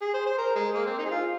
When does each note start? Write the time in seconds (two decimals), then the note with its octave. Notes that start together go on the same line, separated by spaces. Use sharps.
0.01 G#4
0.14 C5
0.26 C5
0.38 A#4
0.56 G#3
0.74 A#3
0.86 C4
0.99 D#4
1.06 G#4
1.11 F4